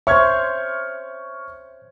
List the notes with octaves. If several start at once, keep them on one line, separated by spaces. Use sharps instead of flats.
C5 C#5 E5 C#6 F6 G#6